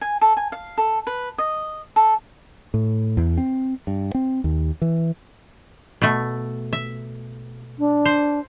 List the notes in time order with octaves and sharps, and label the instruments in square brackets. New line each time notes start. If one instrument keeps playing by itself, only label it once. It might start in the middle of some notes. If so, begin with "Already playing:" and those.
[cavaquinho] G#5
A4
G#5
F5
A4
B4
D#5
A4
[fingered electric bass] A2
E2
C4
G2
C4
D#2
E3
[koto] B2 A3
E5
[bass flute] D4
[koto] C5